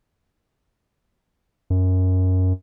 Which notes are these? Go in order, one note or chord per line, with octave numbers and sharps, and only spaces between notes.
F#2